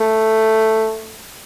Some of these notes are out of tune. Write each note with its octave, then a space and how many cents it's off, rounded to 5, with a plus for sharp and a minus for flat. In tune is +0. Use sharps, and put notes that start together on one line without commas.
A3 +5